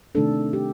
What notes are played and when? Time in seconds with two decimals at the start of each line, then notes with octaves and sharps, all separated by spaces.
0.15 C3 D#3 A3 D4 A4
0.53 G4